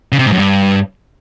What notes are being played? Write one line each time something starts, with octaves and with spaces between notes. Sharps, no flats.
C#3
C3
G#2
F#2
G2